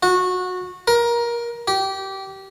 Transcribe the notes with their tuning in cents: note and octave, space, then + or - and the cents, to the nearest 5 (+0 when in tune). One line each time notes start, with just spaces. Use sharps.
F#4 -20
A#4 +20
G4 -20